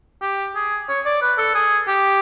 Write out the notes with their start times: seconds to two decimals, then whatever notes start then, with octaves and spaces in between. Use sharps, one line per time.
0.22 G4
0.56 G#4
0.89 C#5
1.05 D5
1.22 B4
1.38 A4
1.55 G#4
1.88 G4